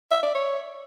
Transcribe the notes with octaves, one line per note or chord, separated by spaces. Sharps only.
E5
D5
C#5